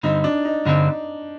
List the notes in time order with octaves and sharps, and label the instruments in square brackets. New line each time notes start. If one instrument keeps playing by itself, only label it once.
[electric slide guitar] G2 D3 G3 C4 [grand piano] D#4
[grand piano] D4
D#4
[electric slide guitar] G2 D3 G3 C4 [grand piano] D#4